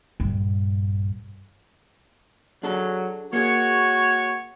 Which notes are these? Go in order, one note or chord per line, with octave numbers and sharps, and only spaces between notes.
A#1 G2
F#3 D4 G#4 A4
A#3 F#4 G#4 C#5